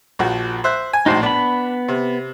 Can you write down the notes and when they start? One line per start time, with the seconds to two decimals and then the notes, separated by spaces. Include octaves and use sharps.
0.19 A#1 F3 F#4
0.64 C5 E5 F#6
0.93 G#5
1.06 A#1 A2 D#4 F#4 C5
1.23 B3 D4 B5
1.88 C3